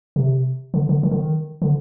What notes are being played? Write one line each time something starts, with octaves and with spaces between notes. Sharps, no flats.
C3
D3
D3
D#3
D3
D#3
D3